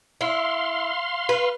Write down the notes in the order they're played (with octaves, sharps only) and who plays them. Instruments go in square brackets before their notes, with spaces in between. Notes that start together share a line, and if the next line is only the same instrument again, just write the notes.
[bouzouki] E4 [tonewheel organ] F5 C6
[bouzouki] B4